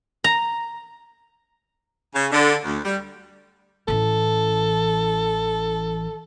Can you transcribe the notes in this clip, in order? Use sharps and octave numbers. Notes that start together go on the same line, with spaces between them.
A#5
C#3
D3
D2
G3
A1 E3 A4